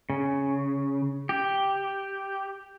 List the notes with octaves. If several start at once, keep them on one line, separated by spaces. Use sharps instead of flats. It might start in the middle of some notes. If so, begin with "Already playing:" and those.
C#3
G4